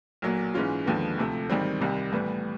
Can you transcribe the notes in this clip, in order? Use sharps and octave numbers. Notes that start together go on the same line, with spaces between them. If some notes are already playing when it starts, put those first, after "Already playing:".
B1 A#2 F#3 A#3
G#2 E3 G#3 C#4 F4
D#2 D3 F3 G#3 B3
D2 C3 F3 A3
A1 G#2 D#3 G3 C4
C2 C3 D#3 G3
A2 E3 G3 B3